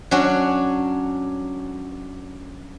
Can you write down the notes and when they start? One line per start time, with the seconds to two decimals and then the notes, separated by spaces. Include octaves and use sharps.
0.11 F#3 C#4 D4 F#4